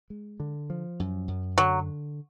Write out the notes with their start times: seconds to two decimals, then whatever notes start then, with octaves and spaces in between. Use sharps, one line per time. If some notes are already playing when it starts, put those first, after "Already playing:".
0.10 G#3
0.40 D3
0.70 F3
1.00 F#2
1.28 F#2
1.58 D3 F#3